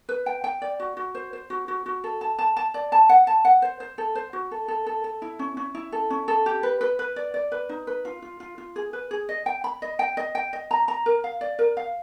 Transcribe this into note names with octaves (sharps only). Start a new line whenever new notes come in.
B4
G5
G5
D5
F#4
F#4
C5
C5
F#4
F#4
F#4
A4
A5
A5
A5
D5
A5
F#5
A5
F#5
C5
C5
A4
C5
F#4
A4
A4
A4
A4
E4
C#4
C#4
E4
A4
C#4
A4
G4
B4
B4
B4
D5
D5
B4
D#4
B4
F4
F4
F4
F4
G#4
B4
G#4
D#5
G5
B5
D#5
G5
D#5
G5
D#5
A#5
A#5
A#4
F5
D5
A#4
F5